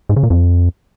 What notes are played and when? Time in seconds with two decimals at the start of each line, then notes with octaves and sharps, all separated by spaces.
0.09 G#2
0.16 C#3
0.23 A#2
0.30 F2